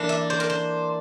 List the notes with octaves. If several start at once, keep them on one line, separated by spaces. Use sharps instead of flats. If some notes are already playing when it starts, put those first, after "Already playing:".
Already playing: E3 A#3 D4
E5
C5
A#4
C5